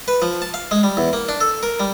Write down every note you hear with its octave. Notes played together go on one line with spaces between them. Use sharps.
B4
F3
A5
F5
G#3
G3
E2
A#3
D4
A4
A#4
G3